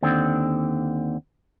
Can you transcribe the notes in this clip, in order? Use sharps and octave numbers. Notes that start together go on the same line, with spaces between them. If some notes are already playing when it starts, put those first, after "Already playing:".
D#2 D3 C4